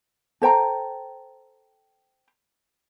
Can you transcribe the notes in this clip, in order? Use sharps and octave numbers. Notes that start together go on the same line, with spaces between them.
A4 C5 G5 A#5